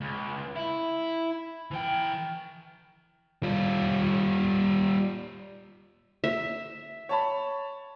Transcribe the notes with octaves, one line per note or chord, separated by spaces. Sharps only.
C#2
E4
E3 G5
G3 F4
E5
C#5 A5 B5